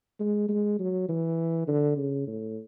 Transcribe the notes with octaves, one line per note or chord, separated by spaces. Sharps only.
G#3
G#3
F#3
E3
D3
C#3
A2